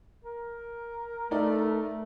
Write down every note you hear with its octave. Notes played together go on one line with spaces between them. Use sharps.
A#4
A3 D#4 D5